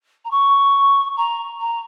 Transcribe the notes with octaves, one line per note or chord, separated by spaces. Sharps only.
A#5
C#6
A#5
A#5